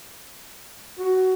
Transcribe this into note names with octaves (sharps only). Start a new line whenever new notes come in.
F#4